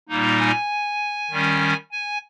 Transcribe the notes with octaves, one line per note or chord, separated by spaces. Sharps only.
A#2 G3 A#3 D#4
G#5
D#3 G3 C#4
G#5